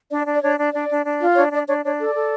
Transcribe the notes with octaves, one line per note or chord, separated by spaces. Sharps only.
D4 D5
D4
D5
D4 C#5
D4
D4 D5
D4
D4
F4
D4 C#5
D4 D5
D4 C#5
D4 C#5
A4 D5
A4